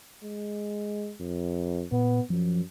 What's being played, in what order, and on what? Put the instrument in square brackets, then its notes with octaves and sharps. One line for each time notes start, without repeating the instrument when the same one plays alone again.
[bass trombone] G#3
F2
[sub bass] A#2 [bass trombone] B3
[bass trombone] F#2 [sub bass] F3